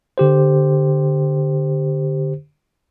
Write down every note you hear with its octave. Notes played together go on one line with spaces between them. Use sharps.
D3 G4 C5